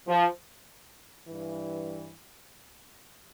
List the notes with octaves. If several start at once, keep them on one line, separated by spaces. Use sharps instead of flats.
F3
G2 E3